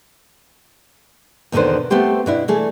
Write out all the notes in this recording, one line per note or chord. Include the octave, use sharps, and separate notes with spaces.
E2 B2 D3 D#3 B4 C5
A3 B3 C4 G4 C5
B2 D4 E4
E3 A3 G#4